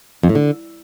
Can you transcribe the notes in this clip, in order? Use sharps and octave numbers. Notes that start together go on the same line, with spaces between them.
F2
A2
D3